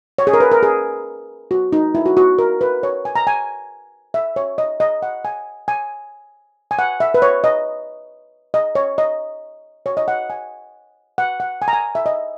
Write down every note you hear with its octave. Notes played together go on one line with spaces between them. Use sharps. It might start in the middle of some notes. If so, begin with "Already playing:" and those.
C#5
G#4
A#4
B4
A#4
G#4
F#4
D#4
E4
F#4
F#4
A#4
B4
C#5
G#5
A#5
G#5
E5
C#5
D#5
D#5
F#5
G#5
G#5
G#5
F#5
E5
B4
C#5
D#5
D#5
C#5
D#5
C#5
D#5
F#5
G#5
F#5
F#5
G#5
A#5
G#5
E5
D#5